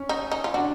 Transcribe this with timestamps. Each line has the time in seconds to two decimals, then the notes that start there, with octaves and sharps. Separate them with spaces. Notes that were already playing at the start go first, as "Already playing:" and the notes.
Already playing: C#4
0.09 D#4
0.32 D#4
0.44 F4
0.54 D4 F#4